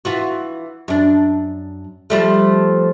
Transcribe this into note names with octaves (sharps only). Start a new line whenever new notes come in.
E3 F4 F#4
F#2 D4
F3 G3 A3